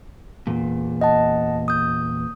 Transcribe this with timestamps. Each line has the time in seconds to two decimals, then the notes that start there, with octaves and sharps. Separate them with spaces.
0.47 E2 A#2
1.01 D#5 F#5 A5
1.68 D#6 G6